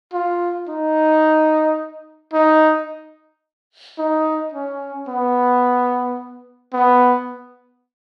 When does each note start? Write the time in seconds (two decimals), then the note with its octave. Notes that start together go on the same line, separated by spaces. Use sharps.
0.13 F4
0.69 D#4
2.33 D#4
3.99 D#4
4.54 C#4
5.08 B3
6.73 B3